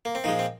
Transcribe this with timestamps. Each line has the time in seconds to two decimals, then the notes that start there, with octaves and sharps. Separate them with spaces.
0.05 A#3
0.15 C4
0.24 A#2 F3 G#3 D#4
0.39 C4